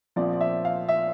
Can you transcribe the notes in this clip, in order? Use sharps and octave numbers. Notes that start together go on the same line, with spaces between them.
A#1 A#2 F3 C4 D5
D5
E5
F5
E5